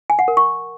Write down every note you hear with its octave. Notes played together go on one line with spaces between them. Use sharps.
G#5
F#5
A#4
C#6